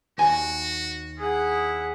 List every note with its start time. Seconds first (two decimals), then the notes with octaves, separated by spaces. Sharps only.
0.18 D#2 F#4 G#5
1.17 E4 G#4 F#5